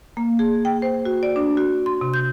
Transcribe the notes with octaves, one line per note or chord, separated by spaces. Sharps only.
A#3
G#4
G5
C5
F#4
D5
D4
F#4
C6
C3
G6